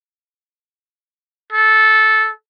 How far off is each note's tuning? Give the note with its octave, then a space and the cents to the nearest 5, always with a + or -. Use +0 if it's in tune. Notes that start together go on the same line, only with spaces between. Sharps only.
A4 -10